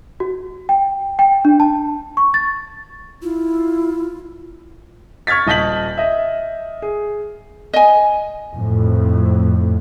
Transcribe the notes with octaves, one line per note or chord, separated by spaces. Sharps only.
F#4
G5
G5
D4
A5
C#6
A6
E4 F4
C#6 F6 G#6 A6 B6
D#1 D#5 A5 G6 B6 F#7
D#5 E5
G#4
D#5 G#5
F2 A2